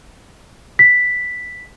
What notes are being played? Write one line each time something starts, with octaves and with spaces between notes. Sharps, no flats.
B6